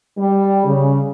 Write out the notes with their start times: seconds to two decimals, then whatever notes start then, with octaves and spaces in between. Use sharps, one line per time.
0.18 G3
0.65 C#3